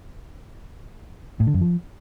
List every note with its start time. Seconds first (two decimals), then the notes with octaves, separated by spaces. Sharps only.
1.40 A2
1.47 D3
1.54 F#2
1.61 F3